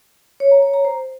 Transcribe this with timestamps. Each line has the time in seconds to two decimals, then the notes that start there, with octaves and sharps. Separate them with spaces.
0.40 C#5
0.51 A#5
0.62 C#5
0.74 A#5
0.85 C5